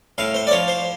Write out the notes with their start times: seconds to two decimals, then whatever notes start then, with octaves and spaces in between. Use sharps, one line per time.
0.18 A2 F5
0.34 C5
0.47 D5
0.51 F3 C#5
0.68 C5